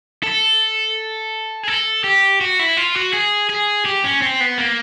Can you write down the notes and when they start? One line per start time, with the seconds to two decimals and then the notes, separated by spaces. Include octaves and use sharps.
0.23 A4
1.63 G#4
1.68 A4
2.04 G4
2.41 F#4
2.59 E4
2.77 F4
2.95 F#4
3.13 G#4
3.49 G#4
3.85 G4
4.04 C#4
4.22 C4
4.40 B3
4.58 A#3